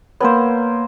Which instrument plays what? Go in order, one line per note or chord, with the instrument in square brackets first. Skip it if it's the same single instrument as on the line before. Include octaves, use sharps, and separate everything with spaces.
[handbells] A#3 C#5 [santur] B3 A#4 C5